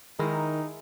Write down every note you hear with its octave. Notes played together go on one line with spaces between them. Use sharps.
D#3 G#3 D#4 E4 A#4